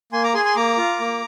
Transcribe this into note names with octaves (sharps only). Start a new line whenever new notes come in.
A#3 G#5 C6
A#5 D6
G#4 G#5 C6
G#5 C6
A#3 A#5 D6
F4
A#3